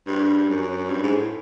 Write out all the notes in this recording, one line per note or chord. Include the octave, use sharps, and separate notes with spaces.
G2
F#2
G2
G#2
A2